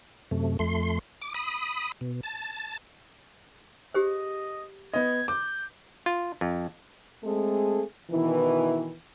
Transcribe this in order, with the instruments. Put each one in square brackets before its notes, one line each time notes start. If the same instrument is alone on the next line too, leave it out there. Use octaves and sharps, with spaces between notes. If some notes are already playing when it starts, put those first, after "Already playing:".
[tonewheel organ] F#2 C3 A3
F2 A3 C6
D6
B5 D#6
B2
A5
[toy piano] G4 G#4 C5 [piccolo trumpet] D#5
[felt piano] B3 D#5 [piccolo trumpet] G#6
[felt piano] D6 [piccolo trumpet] G6
[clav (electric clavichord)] F4
F2
[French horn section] G#3 A3 C4 G#4 A4
B2 D#3 E3